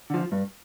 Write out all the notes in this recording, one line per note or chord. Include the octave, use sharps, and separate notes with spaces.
D3 F3
G2